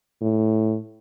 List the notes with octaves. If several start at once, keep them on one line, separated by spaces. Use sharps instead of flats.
A2